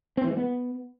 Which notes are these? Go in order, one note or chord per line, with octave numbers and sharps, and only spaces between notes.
C4
E3
G#3
B3